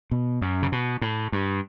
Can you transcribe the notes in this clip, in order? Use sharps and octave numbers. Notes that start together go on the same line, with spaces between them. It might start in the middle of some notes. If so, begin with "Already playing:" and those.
B2
F#2
C#3
B2
A2
G2